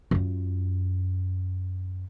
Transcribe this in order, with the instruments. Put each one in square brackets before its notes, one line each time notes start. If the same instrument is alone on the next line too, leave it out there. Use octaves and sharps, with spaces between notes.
[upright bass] F#2 F4